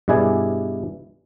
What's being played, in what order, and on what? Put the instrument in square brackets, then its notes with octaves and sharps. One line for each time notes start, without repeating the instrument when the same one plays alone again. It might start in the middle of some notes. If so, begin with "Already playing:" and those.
[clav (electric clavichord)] G2 B2 E4 G#4 D5 G#5